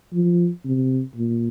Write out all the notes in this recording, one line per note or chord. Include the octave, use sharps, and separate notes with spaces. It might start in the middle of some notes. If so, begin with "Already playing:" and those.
F3
C3
A#2